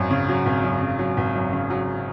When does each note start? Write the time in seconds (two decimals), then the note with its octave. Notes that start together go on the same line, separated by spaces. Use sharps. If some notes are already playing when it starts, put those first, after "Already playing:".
Already playing: G#1 F#2 F#3
0.11 C#3
0.29 F#3
0.46 G#1
0.63 F#2
0.81 C#3
0.99 F#3
1.17 G#1
1.35 F#2
1.53 C#3
1.70 F#3